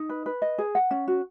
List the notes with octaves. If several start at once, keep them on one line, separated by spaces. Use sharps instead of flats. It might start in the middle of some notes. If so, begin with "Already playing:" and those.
Already playing: D#4
B4
B4
D#5
G#4
F#5
C#4
F#4